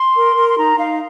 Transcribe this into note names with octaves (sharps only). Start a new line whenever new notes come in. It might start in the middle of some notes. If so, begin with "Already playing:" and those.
Already playing: C6
A#4
A#4
C6
D#4 A#5
D#4 F5